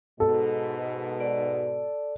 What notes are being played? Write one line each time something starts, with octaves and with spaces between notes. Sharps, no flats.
G#2 B2 A4
D5